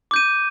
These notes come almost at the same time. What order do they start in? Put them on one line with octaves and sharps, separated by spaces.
D6 G6 D#7